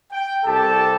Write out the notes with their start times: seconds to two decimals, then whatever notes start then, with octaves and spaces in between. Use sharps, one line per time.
0.12 G5
0.45 C2 G4 A4 A5